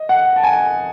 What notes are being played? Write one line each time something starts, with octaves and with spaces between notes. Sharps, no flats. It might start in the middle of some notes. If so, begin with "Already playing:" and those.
Already playing: D#5
F#5
A5
G#5